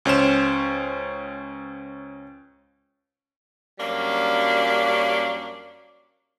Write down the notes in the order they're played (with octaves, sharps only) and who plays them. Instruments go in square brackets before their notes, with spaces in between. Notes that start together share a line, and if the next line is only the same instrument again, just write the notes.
[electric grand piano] C#2 C#4 C5 E7
[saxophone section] F#2 F#3 G3 A#3 D4